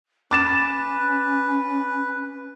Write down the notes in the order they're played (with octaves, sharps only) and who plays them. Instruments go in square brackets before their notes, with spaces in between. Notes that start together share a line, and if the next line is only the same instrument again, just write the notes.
[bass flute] C#4 [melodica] B4 [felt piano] D6 A6 E7